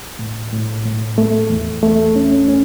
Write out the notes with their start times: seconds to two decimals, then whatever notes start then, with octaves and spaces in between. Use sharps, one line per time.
0.19 A2
0.53 A2
0.85 A2
1.18 A3
1.50 E2
1.83 A3
2.16 C#4
2.49 C#4